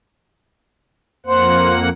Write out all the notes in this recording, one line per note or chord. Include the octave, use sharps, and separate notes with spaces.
F2 A#3 C5 F#5